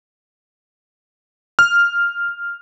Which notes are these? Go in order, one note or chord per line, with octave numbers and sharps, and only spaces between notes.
F6